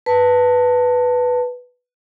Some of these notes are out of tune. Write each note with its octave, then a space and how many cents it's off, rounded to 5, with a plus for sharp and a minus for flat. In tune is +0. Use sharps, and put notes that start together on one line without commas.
B4 +0 A5 +20